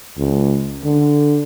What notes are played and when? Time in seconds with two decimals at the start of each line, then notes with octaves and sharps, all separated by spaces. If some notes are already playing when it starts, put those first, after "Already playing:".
0.18 C#2
0.84 D3